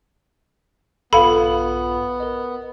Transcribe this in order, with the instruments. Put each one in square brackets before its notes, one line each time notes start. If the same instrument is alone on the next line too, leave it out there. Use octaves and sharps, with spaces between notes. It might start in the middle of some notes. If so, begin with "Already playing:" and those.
[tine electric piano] A#1 G2 F4 [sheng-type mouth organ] B3 [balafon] A4 F5 [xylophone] B5
[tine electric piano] A#4 D#5